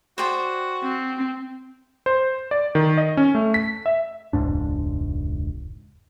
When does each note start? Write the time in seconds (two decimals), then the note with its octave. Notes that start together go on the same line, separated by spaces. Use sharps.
0.18 F#4 C5 D5 G5
0.83 C4
2.06 C5
2.51 D5
2.75 D#3
2.98 D#5
3.17 C#4
3.35 A3
3.54 B6
3.86 E5
4.33 E1 C#2 G#2 D4